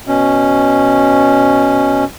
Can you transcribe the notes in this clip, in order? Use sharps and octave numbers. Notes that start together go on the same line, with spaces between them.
B2 C#4